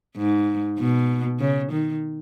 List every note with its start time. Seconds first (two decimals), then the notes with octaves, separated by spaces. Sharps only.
0.16 G#2
0.79 B2
1.40 C#3
1.72 D#3